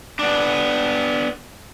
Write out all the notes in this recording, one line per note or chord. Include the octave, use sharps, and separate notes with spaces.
B3 D4